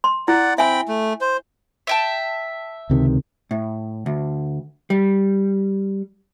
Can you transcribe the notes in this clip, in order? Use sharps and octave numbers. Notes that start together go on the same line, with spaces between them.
C6
E4 D5 F#5
C4 E5 G5 G#5 B5
A3
C5
E5 G5 A5
C#2 C3 D#3
A2
D2
G3